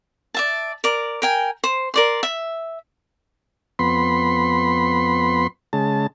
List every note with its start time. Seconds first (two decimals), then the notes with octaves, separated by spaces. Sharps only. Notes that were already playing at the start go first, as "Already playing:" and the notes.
0.34 D5 E5 A5
0.84 A#4 D5
1.22 A#4 G5 G#5
1.64 C5
1.94 A#4 D5 C6
2.23 E5
3.79 F2 B3 B5 C6
5.73 C#3 G#3 A5